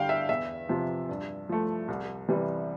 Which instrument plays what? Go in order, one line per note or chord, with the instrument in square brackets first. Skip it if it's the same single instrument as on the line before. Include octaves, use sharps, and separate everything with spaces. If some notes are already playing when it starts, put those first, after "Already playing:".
Already playing: [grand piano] G2 D3 G3 F5 G5
E5
E2 E5
C3 F3
G2
F3 A3
C2
C3 E3 G3